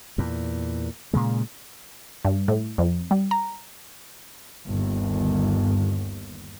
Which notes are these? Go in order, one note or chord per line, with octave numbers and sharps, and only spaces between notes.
E2 A#2
A#2 C#3 G#3
G2
A2
F2
G3
A#5
G1 D#2